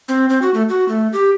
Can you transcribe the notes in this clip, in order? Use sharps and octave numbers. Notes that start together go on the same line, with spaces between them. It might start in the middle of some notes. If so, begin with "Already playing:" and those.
C4
C4
F#4
A3
F#4
A3
G4